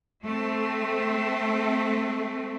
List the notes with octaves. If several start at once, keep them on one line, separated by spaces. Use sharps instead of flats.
A3 C4